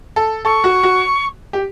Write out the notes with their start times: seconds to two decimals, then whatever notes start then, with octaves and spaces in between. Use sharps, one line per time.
0.16 A4
0.45 A4 C#6
0.64 F#4
0.83 F#4
1.53 G4